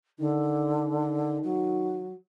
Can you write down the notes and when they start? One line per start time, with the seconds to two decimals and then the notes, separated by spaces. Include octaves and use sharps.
0.19 D3 D#3
1.44 F#3